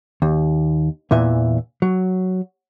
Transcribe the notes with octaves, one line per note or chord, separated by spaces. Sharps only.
D#2
E2 A#2 E3 E5
F#3